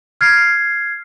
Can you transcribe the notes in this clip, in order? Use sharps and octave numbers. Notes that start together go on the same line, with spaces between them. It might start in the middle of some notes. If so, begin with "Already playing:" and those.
F6 G#6 C7